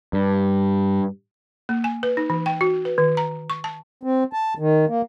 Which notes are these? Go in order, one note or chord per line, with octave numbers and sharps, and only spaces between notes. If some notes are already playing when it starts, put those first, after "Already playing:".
G2
A#3
G#5
B4
D#4
E3
G5
F#4
B4
D#3
A#5
C#6
A5
C4
A5
D#3
A#3